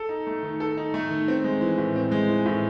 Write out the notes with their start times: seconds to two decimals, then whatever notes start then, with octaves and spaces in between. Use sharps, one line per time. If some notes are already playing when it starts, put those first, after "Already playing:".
Already playing: A4
0.09 D#4
0.27 A3
0.43 D#3
0.60 A4
0.77 D#4
0.94 A3
1.11 D#3
1.28 C4
1.44 G#3
1.61 E3
1.78 A2
1.96 C4
2.12 G#3
2.29 E3
2.46 A2